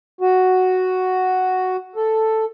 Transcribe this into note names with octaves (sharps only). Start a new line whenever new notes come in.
F#4
A4